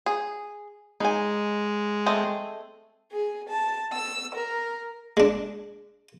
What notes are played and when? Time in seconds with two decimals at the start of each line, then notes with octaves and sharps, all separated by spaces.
0.06 G#4
1.00 G#3 D#4 G#5
2.06 A3 C4 D#5
3.12 G#4
3.49 A5
3.93 E6
4.35 A#4
5.17 G#3 D4